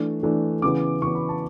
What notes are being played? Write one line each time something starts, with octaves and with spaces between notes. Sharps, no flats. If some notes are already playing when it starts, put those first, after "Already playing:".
Already playing: E3 A3 D4 C#6
E3 A3 D4
C#3 E3 B3 D6
C#3 E3 B3 C#6
B5
A5